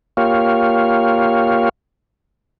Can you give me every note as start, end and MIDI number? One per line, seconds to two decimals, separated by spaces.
0.17 1.69 58
0.17 1.69 65
0.17 1.69 67
0.17 1.69 73
0.17 1.69 77